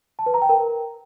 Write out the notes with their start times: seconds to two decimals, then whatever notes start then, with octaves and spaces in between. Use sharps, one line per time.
0.19 A5
0.26 B4
0.34 A#5
0.42 G5
0.49 A#4